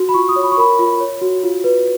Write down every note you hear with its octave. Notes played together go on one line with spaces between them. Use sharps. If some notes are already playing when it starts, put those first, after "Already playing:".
Already playing: F#4
B5
F4 C#6
D#6
C#5
B5
C#6
A#4 B5
F4
C#5
F#4
F4
B4